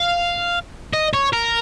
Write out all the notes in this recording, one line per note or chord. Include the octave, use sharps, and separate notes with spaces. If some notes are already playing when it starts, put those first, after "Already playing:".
Already playing: F5
D#5
C#5
A#4